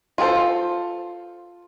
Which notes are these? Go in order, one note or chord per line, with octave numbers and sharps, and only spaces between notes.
F4 F#4 G#4 A4 C5